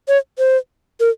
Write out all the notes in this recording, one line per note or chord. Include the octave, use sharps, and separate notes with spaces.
C#5
C5
A#4